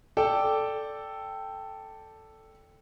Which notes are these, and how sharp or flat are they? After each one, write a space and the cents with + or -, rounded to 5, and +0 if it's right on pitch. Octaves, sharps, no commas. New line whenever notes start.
A4 +0 D5 +0 G5 +0